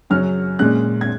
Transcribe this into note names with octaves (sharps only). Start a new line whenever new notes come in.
F#2 C#3 F#3 C#4 F6
A#2 G#3 C#4 F#6
G#6